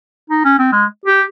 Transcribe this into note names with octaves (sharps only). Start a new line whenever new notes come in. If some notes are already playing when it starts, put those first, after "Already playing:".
D#4
C#4
C4
G#3
G4